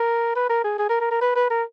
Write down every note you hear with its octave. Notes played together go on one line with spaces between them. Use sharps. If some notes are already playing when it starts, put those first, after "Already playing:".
Already playing: A#4
B4
A#4
G#4
G#4
A#4
A#4
A#4
B4
B4
A#4